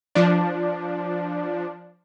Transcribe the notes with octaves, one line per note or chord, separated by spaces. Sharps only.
F3 D4